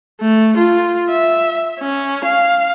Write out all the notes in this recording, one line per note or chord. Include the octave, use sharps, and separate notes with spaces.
A3
F4
E5
C#4
F5